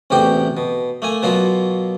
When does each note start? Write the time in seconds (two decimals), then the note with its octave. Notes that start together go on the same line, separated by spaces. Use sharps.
0.10 A1 E2 C3 F#4 G4 G5
0.57 B2
1.02 A3 A#3 G#5
1.23 B2 F#3 A#3 F4 F#4